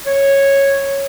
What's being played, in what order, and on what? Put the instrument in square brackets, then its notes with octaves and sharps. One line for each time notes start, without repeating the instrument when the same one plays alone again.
[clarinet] C#5